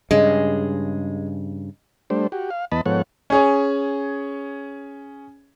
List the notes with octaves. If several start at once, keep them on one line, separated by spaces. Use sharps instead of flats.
G2 C#3 G#3
G3 A3 D4 C5
F#4 G4
F5
E2 B3 D#5 A5 B5
G#2 F3 B3 A4 C#5 F#5
C#4 G#4 C#5